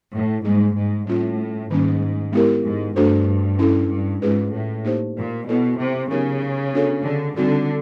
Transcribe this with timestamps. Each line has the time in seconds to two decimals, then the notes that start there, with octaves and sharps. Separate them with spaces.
0.13 A2
0.44 G#2 G3 A#3 D#4 G#4
0.76 G#2
1.07 A2 G3 A#3 C#4 F4
1.70 G#2 D#3 G3 A#3 C#4
2.32 G#3 B3 E4 G4 A#4
2.64 G#2
2.96 G2 A3 D4 F#4 A4 C5
3.59 C#4 E4 A4
3.90 G2
4.22 G#2 G#3 C#4 F4 G#4 B4
4.53 A2
4.84 A#3 D#4 G4 C5
5.16 A#2
5.47 B2 B3 E4 A4 C#5
5.79 C3
6.11 C#3 F#3 B3 D#4 G4 A#4
6.74 B3 D4 F#4 A4 C#5
7.05 D3
7.36 D3 G3 C4 D#4 F#4 A4